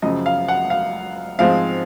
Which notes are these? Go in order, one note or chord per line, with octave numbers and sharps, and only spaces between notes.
F#2 C#3 F3 D#5
F5
F#5
F5
G#2 F3 G#3 C4 F5